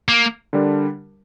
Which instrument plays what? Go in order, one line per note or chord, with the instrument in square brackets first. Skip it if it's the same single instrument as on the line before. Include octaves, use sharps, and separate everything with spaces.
[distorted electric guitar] A#3
[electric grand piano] D3 G3 D4 A#4